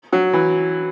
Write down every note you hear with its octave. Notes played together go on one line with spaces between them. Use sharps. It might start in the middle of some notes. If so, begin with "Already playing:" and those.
F#3
E3